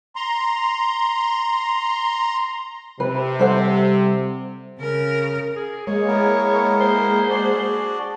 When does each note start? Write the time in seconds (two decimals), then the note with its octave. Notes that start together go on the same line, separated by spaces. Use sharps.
0.16 A#5 C6
3.00 C3 B4
3.39 G3 A4 C5 F#5
4.80 C#3 A#4
5.56 G#4
5.87 G#3 A#3 G#4 C#5
6.08 B3 E4 A#4
6.80 C5
7.30 D4 F#4 D5